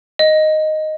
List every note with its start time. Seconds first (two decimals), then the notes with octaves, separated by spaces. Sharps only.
0.19 D#5